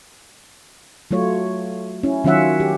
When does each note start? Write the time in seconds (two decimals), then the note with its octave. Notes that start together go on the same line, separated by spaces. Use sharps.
1.11 F#3 A3 F4 C#5
2.03 C#4 E4
2.24 D#3 F#3 C#4 F4 E5 F#5
2.60 G4